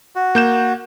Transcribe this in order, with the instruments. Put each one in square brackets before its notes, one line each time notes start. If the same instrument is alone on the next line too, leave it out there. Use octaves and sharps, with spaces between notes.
[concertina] F#4
[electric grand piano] A#3 G6 E7